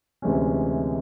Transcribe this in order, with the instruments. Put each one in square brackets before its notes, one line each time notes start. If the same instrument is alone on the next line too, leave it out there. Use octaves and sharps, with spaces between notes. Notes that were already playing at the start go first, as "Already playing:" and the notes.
[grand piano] D2 C3 E3 G#3 C#4